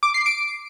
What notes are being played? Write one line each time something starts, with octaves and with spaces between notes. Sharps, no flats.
D6
C7
D7